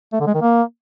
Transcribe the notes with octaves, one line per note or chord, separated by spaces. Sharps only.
A3
D3
G#3
D#3
A#3